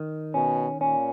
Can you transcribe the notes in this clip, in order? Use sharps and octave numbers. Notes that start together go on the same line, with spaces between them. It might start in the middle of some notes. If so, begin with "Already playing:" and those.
Already playing: D#3
B2 C#4
A#2 C#4